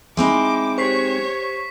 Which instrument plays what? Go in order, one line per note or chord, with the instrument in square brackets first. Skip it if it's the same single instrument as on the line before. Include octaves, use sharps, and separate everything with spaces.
[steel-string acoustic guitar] G#3 C4 D#4 [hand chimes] E5 G#5 B5 [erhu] D6
[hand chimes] G4 C5 [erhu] C#5 [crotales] C#6 B6 C7